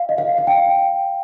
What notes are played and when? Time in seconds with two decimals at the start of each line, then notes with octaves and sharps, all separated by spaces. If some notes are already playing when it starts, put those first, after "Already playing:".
Already playing: F5
0.09 D#5
0.18 F5
0.38 F5
0.47 G5